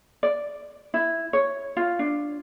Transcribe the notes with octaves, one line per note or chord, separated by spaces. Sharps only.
D5
E4
C#5
F4
D4